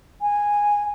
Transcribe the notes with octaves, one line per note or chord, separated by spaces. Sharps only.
G#5